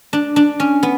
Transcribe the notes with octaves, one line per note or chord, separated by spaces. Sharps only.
D4
D4
C#4
B3